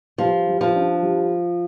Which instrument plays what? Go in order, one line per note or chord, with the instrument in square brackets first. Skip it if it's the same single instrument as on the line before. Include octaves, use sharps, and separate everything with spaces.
[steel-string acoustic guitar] F3 [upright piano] G3
[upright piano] G3
[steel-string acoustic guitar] F3
[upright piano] D4
G3